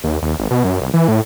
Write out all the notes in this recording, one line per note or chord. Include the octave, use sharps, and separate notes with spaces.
D#2
D#2
G#1
B2
F#2
C2
E3
A2